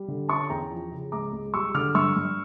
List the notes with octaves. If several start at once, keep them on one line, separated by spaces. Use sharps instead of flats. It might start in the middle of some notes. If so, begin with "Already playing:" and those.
Already playing: G3
D3
C#4 A5 C#6
E2 G5 A#5
F3
C#3
C#2 A#5 D6
C#2
G3 C#6 E6
D3 D6 F6
G2 C#6 E6
G2